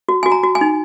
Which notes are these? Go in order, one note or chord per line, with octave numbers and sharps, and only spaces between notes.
F#4
F#4 G#5
A#5
F#4
G#5
D#4